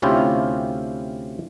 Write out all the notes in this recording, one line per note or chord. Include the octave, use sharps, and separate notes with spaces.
D2 C3 C#4 E4 F4 G4